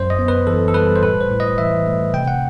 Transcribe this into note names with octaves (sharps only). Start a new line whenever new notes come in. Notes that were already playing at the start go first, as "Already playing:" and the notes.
Already playing: F#2 C5
D#5
B3
B4
E3 A4
A4
G3 B4
C5
A2 B4
C5
A2
D#5
E3 E5
A3
C3 G5
F#5